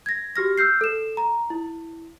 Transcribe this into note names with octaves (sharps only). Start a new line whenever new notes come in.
G#6 A#6
F#4 G4 F6 A#6
E6 F6 G6 C7
A4 E7
A#5
E4